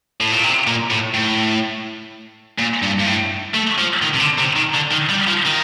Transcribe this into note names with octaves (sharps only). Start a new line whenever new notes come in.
A2
A#2
C3
A#2
A2
A2
A#2
G2
G2
A2
A3
F3
D#3
C3
D3
C3
D#3
D3
D#3
G3
F3
D#3